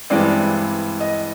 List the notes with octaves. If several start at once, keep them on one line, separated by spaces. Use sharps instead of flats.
G2 E3 G#3 C4 D5
D#5